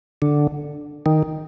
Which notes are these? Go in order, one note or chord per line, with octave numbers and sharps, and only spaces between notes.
D3
D#3